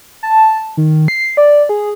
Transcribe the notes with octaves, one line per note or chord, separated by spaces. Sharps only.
A5
D#3
C7
D5
G#4